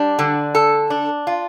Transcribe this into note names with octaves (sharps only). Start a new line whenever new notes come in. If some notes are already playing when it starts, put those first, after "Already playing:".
Already playing: G3 D4
D3
A4
D4
F4